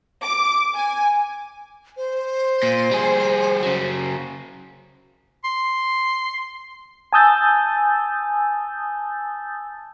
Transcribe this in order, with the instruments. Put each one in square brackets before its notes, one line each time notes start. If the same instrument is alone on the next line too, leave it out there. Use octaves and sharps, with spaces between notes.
[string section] D6
G#5
[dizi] C5
[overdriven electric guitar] A#2
G3 G#4
C#3 F#3
[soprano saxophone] C6
[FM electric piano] G#5 A5 D#6 E6 G6 A6